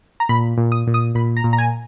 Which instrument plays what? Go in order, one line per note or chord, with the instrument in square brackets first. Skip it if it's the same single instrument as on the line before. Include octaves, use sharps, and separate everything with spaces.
[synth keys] A#5
A#2 B5
A#2
D#6
A#2
D#6
A#2 B5
A#5
A#2
A#5
G#5